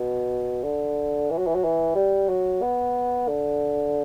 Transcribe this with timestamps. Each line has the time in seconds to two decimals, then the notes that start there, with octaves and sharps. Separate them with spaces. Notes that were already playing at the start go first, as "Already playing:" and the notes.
Already playing: B2
0.64 D3
1.30 E3
1.38 F#3
1.47 E3
1.55 F#3
1.64 E3
1.95 G3
2.29 F#3
2.62 B3
3.28 D3